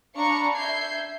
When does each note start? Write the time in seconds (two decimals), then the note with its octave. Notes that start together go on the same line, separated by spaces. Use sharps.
0.15 D4 F5 A#5 B5 C#6
0.56 E5 G6 G#6 C7